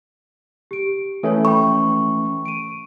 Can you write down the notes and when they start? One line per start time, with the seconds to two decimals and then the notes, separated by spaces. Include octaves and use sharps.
0.71 G4 D7
1.23 E3 A3 C#4 A4 C#5
1.45 G5 B5 C#6
2.46 D7 D#7